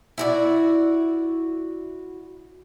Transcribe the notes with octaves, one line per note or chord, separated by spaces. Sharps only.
E4 F#4 D5